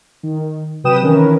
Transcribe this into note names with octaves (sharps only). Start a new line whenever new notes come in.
D#3
C3 F#3 B4 G5 D#6 E7
D#3 E3 C#4 A#4 B4